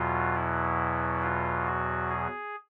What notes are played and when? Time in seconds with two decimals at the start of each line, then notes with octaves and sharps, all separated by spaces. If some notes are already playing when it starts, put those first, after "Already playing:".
Already playing: E2 B2 F#3 F4
0.35 E4
1.22 F4
1.67 F#4
2.09 G#4